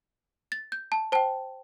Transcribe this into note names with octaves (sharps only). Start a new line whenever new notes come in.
A6
G6
A5
C5 G5 A5